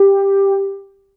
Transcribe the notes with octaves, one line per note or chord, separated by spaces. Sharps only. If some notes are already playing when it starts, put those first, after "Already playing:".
Already playing: G4